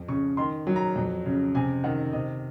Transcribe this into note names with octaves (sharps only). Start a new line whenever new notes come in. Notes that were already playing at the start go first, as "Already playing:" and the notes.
Already playing: F2
C#3 C#6
D#3 C6
F#3
A#5
F2
C#3
C3 G#5
D#3 F#5
C3 D#5